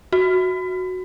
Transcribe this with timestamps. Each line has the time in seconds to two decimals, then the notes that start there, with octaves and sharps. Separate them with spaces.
0.13 F#4